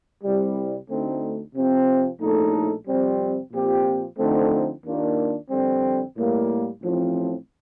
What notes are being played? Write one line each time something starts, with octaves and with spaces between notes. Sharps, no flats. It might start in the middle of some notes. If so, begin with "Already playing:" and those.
C2 C3 G3
D2 D3 A3 C4 D#4
C3 F3 C4
A#1 A2 A3 D#4 A4
F2 C3 G3 C4
A#2 F3 C4 G4
D3 F3 A3 C4 D#4
D#2 D#3 A#3 D4 F4
F2 D3 G3 C4
A2 G3 A#3
A1 A2 F3 C4